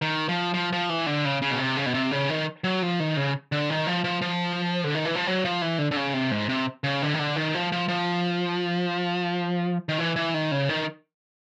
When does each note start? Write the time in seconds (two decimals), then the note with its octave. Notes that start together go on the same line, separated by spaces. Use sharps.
0.02 D#3
0.29 F3
0.54 F3
0.72 F3
0.89 E3
1.06 D3
1.25 C#3
1.42 C#3
1.50 B2
1.59 C3
1.77 C#3
1.86 B2
1.94 C3
2.11 C#3
2.29 D#3
2.64 F#3
2.82 F3
3.00 D#3
3.17 C#3
3.52 D3
3.70 D#3
3.87 F3
4.04 F3
4.22 F3
4.84 D3
4.95 D#3
5.05 E3
5.15 F3
5.27 F#3
5.45 F3
5.62 E3
5.79 D3
5.91 D3
5.96 C#3
6.13 C3
6.31 G#2
6.49 C3
6.84 C#3
7.02 D3
7.14 D#3
7.19 D3
7.36 D#3
7.55 F3
7.72 F3
7.88 F3
9.89 D#3
9.99 E3
10.16 E3
10.34 D#3
10.51 C#3
10.69 D#3